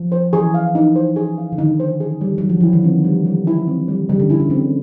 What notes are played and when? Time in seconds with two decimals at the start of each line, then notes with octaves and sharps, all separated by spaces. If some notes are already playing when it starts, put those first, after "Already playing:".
Already playing: F3
0.12 C5
0.33 E3 G#4
0.54 F5
0.75 D#4
0.96 C5
1.16 G#4
1.38 F5
1.52 D3
1.58 D#3 D#4
1.80 C5
2.00 G#4
2.21 G3
2.38 F#3 G3
2.49 F3
2.61 E3 E4
2.73 D#3
2.84 D3 C4
3.05 G3
3.26 G3
3.47 E4
3.67 C4
3.88 G3
4.09 C#3 G3
4.20 D3
4.30 C#3 E4
4.40 D3
4.50 C#3 C4